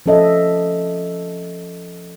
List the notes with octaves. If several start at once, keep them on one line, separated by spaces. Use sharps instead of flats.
F3 C#4 A4 D#5 E5